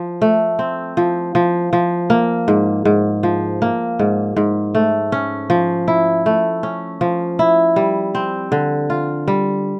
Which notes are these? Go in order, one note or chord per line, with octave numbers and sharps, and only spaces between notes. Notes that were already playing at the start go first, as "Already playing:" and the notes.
Already playing: F3
A3
C4
F3
F3
F3
A#3
G#2
G#2
F3
A#3
G#2
G#2
A3
C#4
F3
E4
A3
C#4
F3
E4
G3
C4
D3
F4
G3